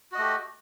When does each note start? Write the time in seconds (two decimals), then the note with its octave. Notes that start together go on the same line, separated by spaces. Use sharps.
0.12 F#4
0.15 D#5
0.18 A3
0.21 G4